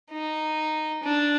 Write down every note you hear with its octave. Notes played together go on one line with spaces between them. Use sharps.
D#4
D4